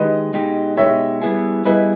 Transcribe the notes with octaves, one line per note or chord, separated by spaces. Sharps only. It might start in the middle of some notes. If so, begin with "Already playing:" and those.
Already playing: D#3 G#3 D#4 G4 B4 D#5
B2 G#3 D#4 G4
B2 G#3 D#4 G4 C#5 E5
G3 B3 E4 G#4
G3 B3 E4 G#4 B4 D#5